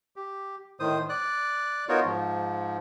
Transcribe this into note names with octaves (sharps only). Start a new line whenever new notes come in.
G4
A2 D#3 C5 D#6
D5 F#6
B3 D#4 F4 F#4 A#4 C#5
G#2 F3